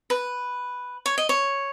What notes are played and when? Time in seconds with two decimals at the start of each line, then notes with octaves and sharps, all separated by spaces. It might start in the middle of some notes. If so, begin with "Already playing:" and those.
0.10 B4
1.06 C#5
1.18 D#5
1.29 C#5